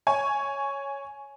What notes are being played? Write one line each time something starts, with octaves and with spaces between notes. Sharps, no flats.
C#5 G#5 C#6